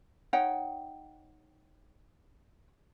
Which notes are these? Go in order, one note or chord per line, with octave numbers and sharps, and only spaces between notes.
D#4 C#5 F#5 G5